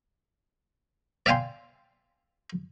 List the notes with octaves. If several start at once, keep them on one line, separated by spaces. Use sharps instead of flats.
D5 E5 F5 G5 G#5 C6